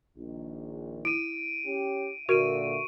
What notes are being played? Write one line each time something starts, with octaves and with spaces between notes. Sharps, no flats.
A#1 D#3
E4 D7 D#7
C#4 G4
A#2 D3 F#4 A#4 E5 C#6 D7 D#7